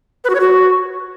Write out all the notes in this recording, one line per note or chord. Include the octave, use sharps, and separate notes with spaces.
B4
F#4
C#5
F#4